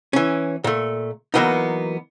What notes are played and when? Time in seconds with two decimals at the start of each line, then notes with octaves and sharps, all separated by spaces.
0.13 E3 C#4
0.64 A#2 A3
1.34 E3 F#3 A#3 B3 D#4